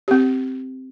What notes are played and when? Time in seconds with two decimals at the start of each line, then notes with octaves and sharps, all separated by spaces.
0.08 C4 G4